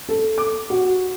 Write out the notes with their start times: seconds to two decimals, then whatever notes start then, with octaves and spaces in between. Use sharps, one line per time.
0.09 A4
0.38 D6
0.70 F#4